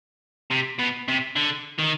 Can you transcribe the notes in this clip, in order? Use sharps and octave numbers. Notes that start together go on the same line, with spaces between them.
C3
B2
C3
D3
D#3